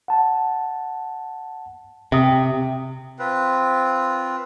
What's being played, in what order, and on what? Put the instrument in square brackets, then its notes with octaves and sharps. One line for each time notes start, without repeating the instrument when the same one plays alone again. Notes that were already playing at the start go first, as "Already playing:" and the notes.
[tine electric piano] F#5 A5
[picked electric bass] C3 [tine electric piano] E5 G5 D#6
[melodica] C4 F4 B4